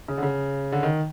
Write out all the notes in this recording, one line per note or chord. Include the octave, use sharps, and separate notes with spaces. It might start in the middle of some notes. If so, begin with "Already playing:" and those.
C#3
D3
C#3
D3
D#3